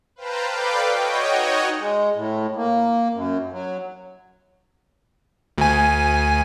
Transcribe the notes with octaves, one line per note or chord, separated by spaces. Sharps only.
B4 C5 F5 G5 A5 A#5
A4 B4 D5 F5 G5 D6
F#4 C#5 D#5 G5
D#4 F#4 C#5 D#5
G#3
A2
A#3
F#2
F#3
D2 G#5